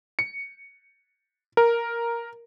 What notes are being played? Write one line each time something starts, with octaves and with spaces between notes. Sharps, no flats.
C#7
A#4